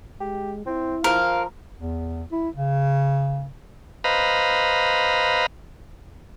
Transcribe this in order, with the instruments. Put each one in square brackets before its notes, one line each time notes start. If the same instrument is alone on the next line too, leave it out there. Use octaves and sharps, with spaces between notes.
[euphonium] G#3 [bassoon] G4
[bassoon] C4 [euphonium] E4
[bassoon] F3 [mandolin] A#4 [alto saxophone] F5
[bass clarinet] E2
E4
C#3
[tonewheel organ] B4 C5 D#5 F5 A#5 B5